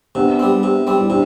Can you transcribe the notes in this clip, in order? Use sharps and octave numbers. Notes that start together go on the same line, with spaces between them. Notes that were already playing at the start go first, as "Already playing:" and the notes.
C3 B3 D4
G3 C4
C3
G3 C4
E4
C3 D4